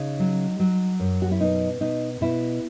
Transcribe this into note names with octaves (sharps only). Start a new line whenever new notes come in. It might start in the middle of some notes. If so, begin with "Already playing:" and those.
Already playing: C#3 D#4
F#3
F#3
F#2
F#4
E4
B2 D#4
B2 D#4
B2 E4